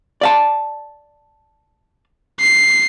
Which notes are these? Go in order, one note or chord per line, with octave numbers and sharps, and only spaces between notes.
D5 F5 A5
C7